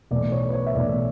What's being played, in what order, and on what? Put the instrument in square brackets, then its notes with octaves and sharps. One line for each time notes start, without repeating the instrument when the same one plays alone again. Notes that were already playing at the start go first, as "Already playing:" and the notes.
[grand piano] B1 A2 E3 D5
C#5
B4
C#5
E5
B1 A2 E3 D5